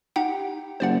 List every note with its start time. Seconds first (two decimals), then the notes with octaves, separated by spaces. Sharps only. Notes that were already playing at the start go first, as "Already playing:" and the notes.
0.16 D#4 G4 F#5 G5
0.80 F#1 C5 D5 F#5